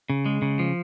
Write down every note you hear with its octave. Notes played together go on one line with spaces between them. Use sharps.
C#3
G#3
C#3
F3